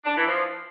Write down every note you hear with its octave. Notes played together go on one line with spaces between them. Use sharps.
D4
E3
F3